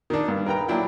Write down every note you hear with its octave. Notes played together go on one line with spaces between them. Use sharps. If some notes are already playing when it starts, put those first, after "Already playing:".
D#3 D4
G2
A#4 B4 G5 A#5
A#2 F#3 D4 E4 G5